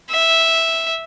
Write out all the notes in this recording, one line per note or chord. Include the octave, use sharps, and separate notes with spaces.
E5